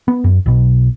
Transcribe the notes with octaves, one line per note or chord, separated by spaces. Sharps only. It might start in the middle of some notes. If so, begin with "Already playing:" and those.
B3
F#2
B1 B2